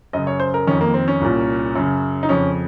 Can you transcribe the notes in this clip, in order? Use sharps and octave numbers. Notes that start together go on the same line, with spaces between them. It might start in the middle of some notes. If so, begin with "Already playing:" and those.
F#2 C#3 D#5
C#5
C5
A#4
F2 D#3 C#4
A#3
C4
C#4
C2 A#2
F#2 C#3
D#4
F2 C#3 C#4